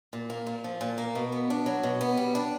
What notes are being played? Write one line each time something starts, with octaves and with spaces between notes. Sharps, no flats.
A#2
A#3
A#2
F3
A#2
A#3
B2
B3
D4
F#3
B2
B3
G3
D4